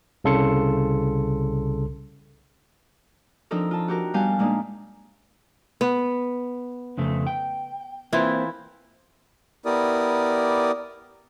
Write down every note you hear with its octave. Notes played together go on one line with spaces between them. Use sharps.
C2 C#3 A4 C6 C#7
F3 C4 D4 D#4 A4 A#4
F4 A5
F#4 G4 A#4
G3 B3 F5 G#5 A5 G6
A#2 G#3 A#3 D4 D#4
B3
F2 C#3 A3
G5
E3 A#3 C4 E4 F4
B3 E4 G4 A#4 D5 D#6